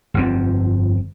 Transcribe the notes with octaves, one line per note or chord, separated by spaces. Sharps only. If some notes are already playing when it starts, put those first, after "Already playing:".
G1 F2 C4